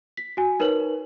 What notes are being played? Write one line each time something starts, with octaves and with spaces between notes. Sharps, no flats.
B6
F#4 G#5
D#4 A#4 B4 C#5 F#7